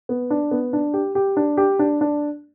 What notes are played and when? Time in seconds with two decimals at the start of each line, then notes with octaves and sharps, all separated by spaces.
0.09 B3
0.30 D4
0.51 B3
0.73 D4
0.94 G4
1.15 G4
1.37 D4
1.57 G4
1.79 D4
2.01 D4